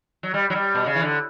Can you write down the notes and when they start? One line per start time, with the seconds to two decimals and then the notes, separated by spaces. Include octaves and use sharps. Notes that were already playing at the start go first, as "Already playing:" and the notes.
0.23 F#3
0.34 G3
0.50 F#3
0.55 G3
0.75 B2
0.86 C#3
0.95 E3
1.02 D3